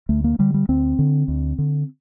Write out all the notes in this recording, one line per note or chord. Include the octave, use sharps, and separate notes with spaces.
D2 A3
A#3
D3 G3
G3
D2 C4
D3
D2
D3